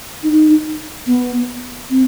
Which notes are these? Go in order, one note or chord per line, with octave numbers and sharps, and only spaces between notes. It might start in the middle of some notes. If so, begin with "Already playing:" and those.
D#4
B3
C4